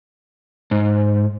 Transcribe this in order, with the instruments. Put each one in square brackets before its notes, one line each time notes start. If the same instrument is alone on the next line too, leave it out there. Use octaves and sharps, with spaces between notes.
[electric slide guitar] G#2